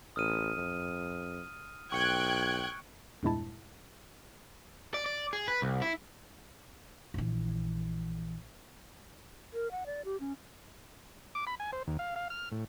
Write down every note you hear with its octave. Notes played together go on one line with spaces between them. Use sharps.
A1 D#6 F6 D#7
F2
B1 G5 C#6 F#6 G#6 C#7
E2 G2 A#2 G#3 E4 A5
D5
D5
G#4
B4
C2
E4
A#1 E3
A#4
F#5
D5
G4
C#4
D6
B5
G#5
C5
D#2
F5
F5
F6
A2